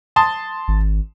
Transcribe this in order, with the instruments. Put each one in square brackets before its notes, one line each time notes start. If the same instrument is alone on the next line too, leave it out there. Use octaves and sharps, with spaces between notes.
[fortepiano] A5 C6 D#6
[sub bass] G#1